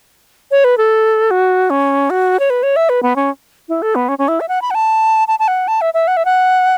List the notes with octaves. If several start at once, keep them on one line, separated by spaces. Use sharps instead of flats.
C#5
B4
A4
F#4
C#4
F#4
C#5
B4
C#5
E5
B4
B3
C#4
E4
A4
B3
C#4
C#4
E4
E5
F#5
B5
F#5
A5
A5
A5
F#5
A5
E5
E5
F#5
E5
F#5